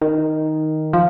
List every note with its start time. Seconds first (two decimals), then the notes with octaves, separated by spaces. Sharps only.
0.01 D#3
0.93 F3